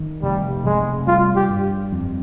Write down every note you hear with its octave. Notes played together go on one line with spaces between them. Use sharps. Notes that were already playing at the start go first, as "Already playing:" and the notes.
Already playing: D#3
F1 G3
F1 G#3
G3 F4
G4
G2
F2